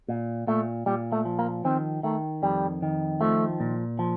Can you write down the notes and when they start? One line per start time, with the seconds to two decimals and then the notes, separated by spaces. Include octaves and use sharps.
0.08 A#2
0.47 A#2 A3
0.86 A#2 G3
1.12 A3
1.25 F3
1.39 A#3
1.65 D#3 C4
2.03 D#3 A3
2.42 F2 G3
2.82 D#3
3.21 F3 A3
3.60 A#2
3.99 F3